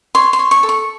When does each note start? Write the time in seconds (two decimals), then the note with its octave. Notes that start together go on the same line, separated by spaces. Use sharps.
0.15 C#5 C6
0.33 C6
0.39 C#5
0.51 C#6
0.63 A4
0.69 C#6